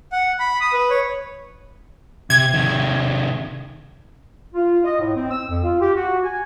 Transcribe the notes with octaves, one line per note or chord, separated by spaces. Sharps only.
F#5
B5
D#6
B4
C#5
C3 G#6
C3 D#3
F4
D#5
A2
C4
E6
F2
F4
G4
F#4
G#5